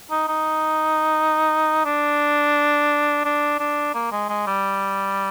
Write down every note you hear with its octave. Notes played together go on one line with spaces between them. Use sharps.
D#4
D#4
D4
D4
D4
A#3
G#3
G#3
G3